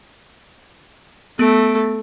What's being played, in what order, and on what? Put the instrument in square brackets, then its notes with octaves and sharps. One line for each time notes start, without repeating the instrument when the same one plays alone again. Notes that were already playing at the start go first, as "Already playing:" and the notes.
[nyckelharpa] A3 [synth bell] B3 D7